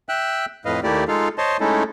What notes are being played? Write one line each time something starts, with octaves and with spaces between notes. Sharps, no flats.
E5 G5 E6 F#6
F2 A2 B4 D#5 F5
D#2 A3 A#3 E4 G4 D5
G#3 D#4 F4 A4 F5
C5 C#5 D#5 A5 C6
G#3 A3 C#4 D#4 E4 A4